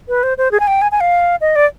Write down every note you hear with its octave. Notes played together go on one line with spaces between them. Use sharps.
B4
C5
C5
G#4
G#5
G5
G#5
G#5
F5
D#5
D5